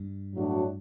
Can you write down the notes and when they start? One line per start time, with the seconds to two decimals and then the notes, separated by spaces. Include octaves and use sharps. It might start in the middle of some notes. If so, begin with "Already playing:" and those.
Already playing: G2
0.34 A2 F#3 A3 D4 F#4